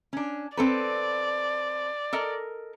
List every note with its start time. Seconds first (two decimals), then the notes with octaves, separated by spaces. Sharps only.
0.13 C#4 D4
0.57 C4 A4 B4 D5
2.13 A4 A#4 D#5